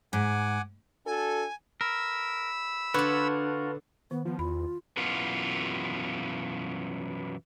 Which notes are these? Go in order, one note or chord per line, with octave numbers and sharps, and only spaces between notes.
G#2 F#5 G#5 D6
D4 F#4 A4 G#5
A#4 B5 E6
D3 D4 F4 F#4 B4 C#5
D#3 B3
F3 B3
E2 F4 B5
F#2 B2 E3 B3 F4